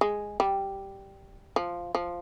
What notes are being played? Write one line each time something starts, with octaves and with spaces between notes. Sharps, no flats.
G#3
G3
F3
F3